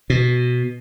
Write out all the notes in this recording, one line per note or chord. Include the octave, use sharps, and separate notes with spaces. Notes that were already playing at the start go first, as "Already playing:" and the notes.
B2